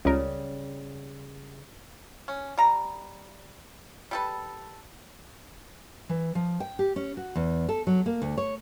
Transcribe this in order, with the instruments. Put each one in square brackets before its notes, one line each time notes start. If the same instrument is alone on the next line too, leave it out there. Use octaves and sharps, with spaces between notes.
[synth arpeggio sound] C#2 A#4 [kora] C#3 G3
[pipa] C#4
G3 A#5
G3 A4 B4
[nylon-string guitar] E3
F3
G5
G4
C#4
F#4
E2
A4
F#3
A#3
D2
C#5